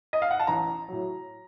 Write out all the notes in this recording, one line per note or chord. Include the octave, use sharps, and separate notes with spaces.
D#5
F5
F#5
A5
A1 A#5
A2 F#3